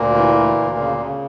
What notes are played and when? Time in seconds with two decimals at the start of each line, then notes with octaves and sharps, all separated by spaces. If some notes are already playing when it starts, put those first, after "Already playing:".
Already playing: D2 A#2 A#3
0.14 E3
0.35 D2
0.56 D2
0.77 C#3
0.98 C#3